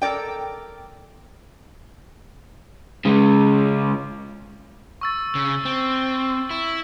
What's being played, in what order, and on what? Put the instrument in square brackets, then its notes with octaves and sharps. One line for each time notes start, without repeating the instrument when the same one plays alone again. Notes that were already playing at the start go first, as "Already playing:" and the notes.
[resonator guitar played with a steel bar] A4 A#4 D5 G5
[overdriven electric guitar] C#3 G#3
[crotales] C#6 E6 A6
[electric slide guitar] C#3
C4
E4